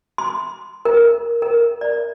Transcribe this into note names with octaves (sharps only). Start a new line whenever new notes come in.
C6
A#4
A#4
D5